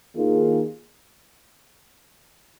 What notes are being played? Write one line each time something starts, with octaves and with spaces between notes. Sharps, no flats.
D#2 D#3 A#3 F4 G#4